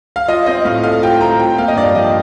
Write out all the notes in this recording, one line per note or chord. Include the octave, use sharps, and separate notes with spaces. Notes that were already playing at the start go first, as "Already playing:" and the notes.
F5
F4 D#5
C4 D#5
A2 F5
A3 F5
F4 G5
C4 A#5
F4 G5
A#3 F5
D#5
G2 D5
F3 D#5